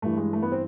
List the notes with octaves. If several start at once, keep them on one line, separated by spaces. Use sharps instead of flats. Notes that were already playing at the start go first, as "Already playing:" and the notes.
G2 E3 A3
G#3
A3
B3
C4